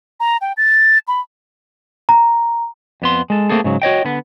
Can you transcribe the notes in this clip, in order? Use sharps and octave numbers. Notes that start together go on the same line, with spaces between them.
A#5
G5
A6
B5
A#5
F2 B3 C6
G#3 A4
A3 A#3 C4 G#4 A4
G#2 C#3 F#3
F#4 C#5 D#5 G5
D3 B3